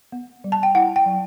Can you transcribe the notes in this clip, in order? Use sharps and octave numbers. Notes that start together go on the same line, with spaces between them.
B3
G3
A5
G5
E4 F#5
G5
F#3